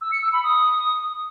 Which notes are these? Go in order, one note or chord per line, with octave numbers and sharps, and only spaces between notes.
E6
C#7
E6
B5
D#6